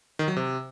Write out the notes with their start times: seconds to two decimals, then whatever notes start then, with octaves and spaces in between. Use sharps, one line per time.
0.19 D#3
0.28 F#3
0.36 C3